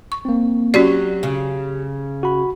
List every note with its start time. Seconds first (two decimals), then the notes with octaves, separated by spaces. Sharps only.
0.12 C#6
0.25 A#3 C4
0.74 F#3 C#4 F#4 G4 D5
1.23 C#3
2.23 F#4 B5